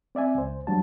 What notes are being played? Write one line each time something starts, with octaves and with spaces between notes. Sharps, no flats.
C4 D5 E5 G#5
C#2 C5
E2 F#3 G3 D4 F#4 A5